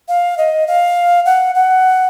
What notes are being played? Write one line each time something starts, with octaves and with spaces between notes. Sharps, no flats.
F5
D#5
F5
F#5
F#5